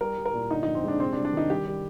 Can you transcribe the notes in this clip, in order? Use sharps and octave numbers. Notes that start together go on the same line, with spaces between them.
G3 A#4
G3
A#4
A#2
D3 D#4
D#4
F2
C4
G#3 D4
C3 C4
D4
G3
D4
D#3 D#4
G3 G4
G3